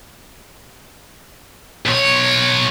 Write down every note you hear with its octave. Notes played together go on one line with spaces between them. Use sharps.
B1 C#5